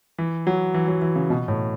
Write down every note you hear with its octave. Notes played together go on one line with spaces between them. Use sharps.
E3
F#3
E3
F#3
E3
C#3
B2
A2